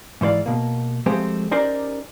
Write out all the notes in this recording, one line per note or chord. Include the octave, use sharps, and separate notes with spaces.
G#2 E3 C5 D5 F5
B2 A#3
F3 G#3 A3 C4 G4 C5
C#4 D#4 G4 A#4 C5 D5